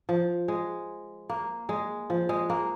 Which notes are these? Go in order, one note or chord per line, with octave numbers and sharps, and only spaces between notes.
F3
G#3
A#3
G#3
F3
G#3
A#3